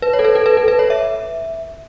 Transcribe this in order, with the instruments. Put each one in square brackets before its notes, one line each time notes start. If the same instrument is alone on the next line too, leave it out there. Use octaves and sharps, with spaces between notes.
[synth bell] B4
C#5
A4
B4
A4
B4
A4
B4
C#5
E5